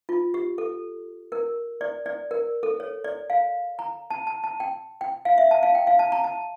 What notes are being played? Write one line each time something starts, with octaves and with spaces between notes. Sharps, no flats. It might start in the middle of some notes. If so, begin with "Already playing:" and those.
F4
G4
A4
A#4
D5
D5
A#4
A4
C#5
D5
F5
A#5
A5
A5
A5
G5
G5
F5
E5
A5
F5
G5
F5
A5
A#5
A5